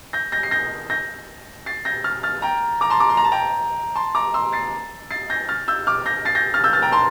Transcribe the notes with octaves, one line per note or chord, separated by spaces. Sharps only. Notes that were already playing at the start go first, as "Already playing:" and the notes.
G6 A#6
G6 A#6
C7
G6 A#6
G6 A#6
A6 C7
G6 A#6
F6 A6
F6 A6
G5 A#5
A#5 D6
A5 C6
A#5 D6
C6
A#5
A5
G5 A#5
A5 C6
A#5 D6
C6 E6
A6 C7
A6 C7
G6 A#6
F6 A6
E6 G6
D6 F6
G6 A#6
A6 C7
G6 A#6
F6 A6
E6 G6
F6 A6
G5 A#5
A5 C6